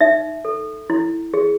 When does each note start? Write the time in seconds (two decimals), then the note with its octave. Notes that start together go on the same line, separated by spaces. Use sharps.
0.01 D#4 E5
0.45 A4
0.90 E4
1.34 G#4